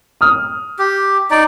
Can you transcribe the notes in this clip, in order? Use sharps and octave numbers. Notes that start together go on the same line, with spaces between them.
D#6 F6
G4
D#4 D5